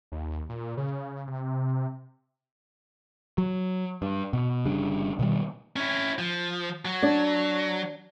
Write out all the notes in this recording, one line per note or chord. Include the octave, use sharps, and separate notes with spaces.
D#2
A#2
C#3
C3
F#3
G2
B2
G1 C#3 G3 D4
B2 D#3 G3
C#4 E4
F3
F#3
D4 D5